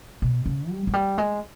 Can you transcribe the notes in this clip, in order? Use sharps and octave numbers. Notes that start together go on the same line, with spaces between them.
B2
C#3
G3
F#3
G3
G#3